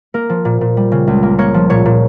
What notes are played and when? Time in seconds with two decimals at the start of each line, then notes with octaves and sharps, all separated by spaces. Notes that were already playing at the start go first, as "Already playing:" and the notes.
0.14 A#3 A#4
0.29 F3
0.45 A#2
0.61 A#2
0.77 G3
0.92 C#3
1.07 C#2
1.23 A#3
1.38 A#3 C#5
1.54 F3
1.70 A#2 C#5
1.85 A#2